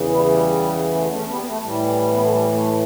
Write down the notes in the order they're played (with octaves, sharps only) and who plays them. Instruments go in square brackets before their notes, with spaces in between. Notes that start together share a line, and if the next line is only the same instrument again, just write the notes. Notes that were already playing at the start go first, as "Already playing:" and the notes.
Already playing: [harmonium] E2 C#3 E3
G3 B3
G3
A3
A3 C#4
G3 B3
B3
A3
A2 E3 G3
B3
A3
G3
A3